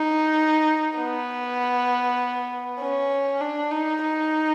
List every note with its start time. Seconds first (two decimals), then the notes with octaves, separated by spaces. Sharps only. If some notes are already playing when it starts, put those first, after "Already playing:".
Already playing: D#4
0.98 B3
2.80 C#4
3.41 D4
3.71 D#4
4.02 D#4